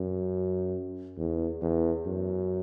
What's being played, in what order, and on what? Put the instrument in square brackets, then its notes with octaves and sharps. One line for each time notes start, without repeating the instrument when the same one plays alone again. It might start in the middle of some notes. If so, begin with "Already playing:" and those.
Already playing: [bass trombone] F#2
E2
E2
F#2